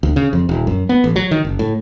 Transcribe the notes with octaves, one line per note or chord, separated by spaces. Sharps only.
D2
C#3
F2
D#1
F#2
B3
A1
F#3
D#3
F#1
A2